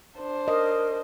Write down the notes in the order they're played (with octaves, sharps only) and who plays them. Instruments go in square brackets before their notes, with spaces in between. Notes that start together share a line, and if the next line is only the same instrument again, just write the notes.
[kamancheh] D4 C5
[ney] A#4 [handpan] D#5